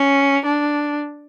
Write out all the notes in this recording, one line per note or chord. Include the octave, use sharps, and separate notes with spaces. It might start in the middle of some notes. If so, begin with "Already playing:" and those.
Already playing: C#4
D4